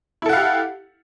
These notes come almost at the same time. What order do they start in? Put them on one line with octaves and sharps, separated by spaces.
E4 A4 F#5 F5 G4